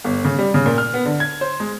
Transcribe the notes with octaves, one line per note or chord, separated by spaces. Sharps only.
G1
C#3
G3
C#3
A#2
F6
B3
D3
G#6
C5
G#3